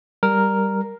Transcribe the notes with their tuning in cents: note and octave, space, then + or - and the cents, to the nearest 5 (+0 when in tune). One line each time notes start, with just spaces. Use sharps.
G3 +0 A#4 +0